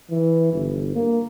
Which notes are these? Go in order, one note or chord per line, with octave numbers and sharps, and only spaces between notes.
E3
G1
A#3